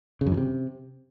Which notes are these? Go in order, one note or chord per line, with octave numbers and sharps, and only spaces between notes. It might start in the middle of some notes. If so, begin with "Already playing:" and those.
C#3
F#2
E3
C3